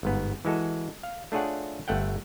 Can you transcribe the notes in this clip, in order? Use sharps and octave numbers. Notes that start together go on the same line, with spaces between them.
G1 G#2 B3
E3 G#3 F#4 A4
F5
A3 D4 F4 G#4 C#5 F#5
G1 A3 F#5 G5